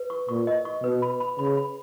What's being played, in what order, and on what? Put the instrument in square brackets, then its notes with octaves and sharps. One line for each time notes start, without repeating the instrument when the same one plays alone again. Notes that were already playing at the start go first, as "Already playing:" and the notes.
Already playing: [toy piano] B4
C#6
[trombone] A#2 [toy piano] C#6
[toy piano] D#5
C#6
[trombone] B2 [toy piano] B4
[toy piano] B5
B5
[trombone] C#3 [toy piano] B5
[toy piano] B5